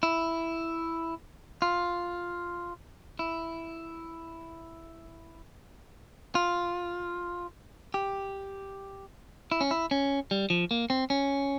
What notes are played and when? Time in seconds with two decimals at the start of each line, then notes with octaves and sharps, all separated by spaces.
0.03 E4
1.62 F4
3.19 E4
6.35 F4
7.94 G4
9.52 E4
9.61 C#4
9.71 E4
9.91 C#4
10.31 G3
10.50 F3
10.71 A#3
10.90 C4
11.10 C#4